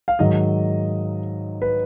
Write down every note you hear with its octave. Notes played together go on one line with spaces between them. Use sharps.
F5
G#2 D#3 F#3 D#5
B4